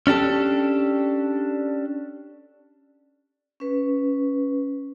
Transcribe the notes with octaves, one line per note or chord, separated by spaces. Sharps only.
C#4 D4 G4 A4
C#4 B4